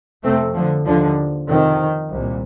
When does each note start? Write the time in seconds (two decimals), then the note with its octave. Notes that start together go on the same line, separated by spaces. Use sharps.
0.23 F2 C3 A3 C4
0.54 D3 F3
0.85 D#2 D3 F3
1.48 F2 C3 D#3
2.10 C2 A#2